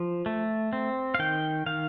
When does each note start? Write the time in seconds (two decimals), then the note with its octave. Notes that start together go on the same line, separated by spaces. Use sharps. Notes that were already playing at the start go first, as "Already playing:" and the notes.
Already playing: F3
0.26 A3
0.73 C4
1.15 F5
1.19 D#3 G5
1.66 D#3 F5